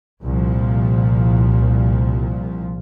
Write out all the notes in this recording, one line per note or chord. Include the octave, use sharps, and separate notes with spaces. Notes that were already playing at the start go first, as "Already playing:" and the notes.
C2 A#2 F3